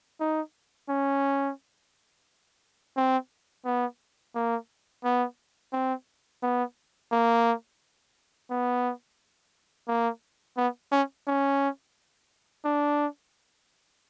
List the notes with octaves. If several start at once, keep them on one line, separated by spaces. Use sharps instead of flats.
D#4
C#4
C4
B3
A#3
B3
C4
B3
A#3
B3
A#3
B3
C#4
C#4
D4